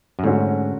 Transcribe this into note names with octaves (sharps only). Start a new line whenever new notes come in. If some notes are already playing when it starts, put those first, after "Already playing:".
F#2
G#2 D3 A3 C#4 F#4